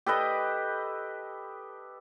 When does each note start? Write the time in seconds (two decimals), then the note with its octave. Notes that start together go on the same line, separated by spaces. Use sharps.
0.06 G4 A4 B4 D#5